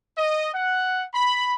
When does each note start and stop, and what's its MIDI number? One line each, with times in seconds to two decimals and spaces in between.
0.18 0.49 75
0.54 1.04 78
1.14 1.54 83